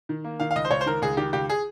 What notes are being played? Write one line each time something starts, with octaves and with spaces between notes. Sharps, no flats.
D#3
A#3
D#3 F5
F5
C#2 D#5
C5
C#2 C#5
C5
D#3 A#4
C#2 G#4
D#3 G4
C#2 G4
G#4